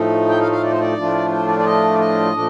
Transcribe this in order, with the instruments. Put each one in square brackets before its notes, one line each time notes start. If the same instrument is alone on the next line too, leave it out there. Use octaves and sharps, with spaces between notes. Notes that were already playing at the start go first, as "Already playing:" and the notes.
Already playing: [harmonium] A2 F3 A3 D#4
G5
F5
F5
D5
C5
D5
A2 F3 A3 D4 F4
C5
D5
D5
D#5
D5
D#5
A#2 F3 A3 D4